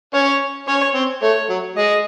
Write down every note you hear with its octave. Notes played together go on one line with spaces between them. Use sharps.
C#4 C#5
C#4 C#5
C4
A3 C#5
F#3
G#3 D#5